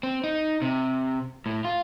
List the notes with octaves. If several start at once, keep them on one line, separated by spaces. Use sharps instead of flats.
C4
D#4
C3
A2
F4